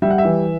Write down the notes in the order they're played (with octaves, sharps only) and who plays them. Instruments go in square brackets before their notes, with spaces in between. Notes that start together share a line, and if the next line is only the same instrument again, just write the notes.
[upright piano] G3 E5
F#5
E5
E3